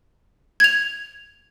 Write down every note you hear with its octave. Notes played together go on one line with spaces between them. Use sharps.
G#6 F7